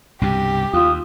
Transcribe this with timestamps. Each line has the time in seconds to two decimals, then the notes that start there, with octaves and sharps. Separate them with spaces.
0.21 C2 G2 B2 G4
0.73 D#2 F4 D#6